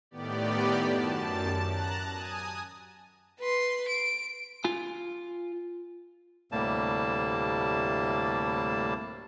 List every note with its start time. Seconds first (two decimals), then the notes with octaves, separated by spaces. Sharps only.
0.11 A2 D#3 B3 G4 D5
0.86 F#2 A5
1.68 A5 A#5 F#6
2.12 G#5 D#6
3.39 B4 C6
3.88 D7
4.64 F4 G#5
6.52 D2 A2 C3 G3 A#3 A5